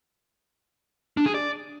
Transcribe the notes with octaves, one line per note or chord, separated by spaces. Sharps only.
D4
G#4
D5